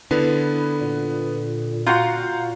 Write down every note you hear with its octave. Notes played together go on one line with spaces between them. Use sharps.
D3 B3 E4 B4
A#2
F4 F#4 F5 F#5 A#5 G6